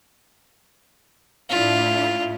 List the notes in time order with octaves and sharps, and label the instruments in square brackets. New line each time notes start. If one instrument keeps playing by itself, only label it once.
[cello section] A2 D4 E4 [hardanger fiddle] F4